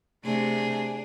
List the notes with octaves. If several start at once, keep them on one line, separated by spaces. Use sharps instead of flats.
C3 A3 D4 G#4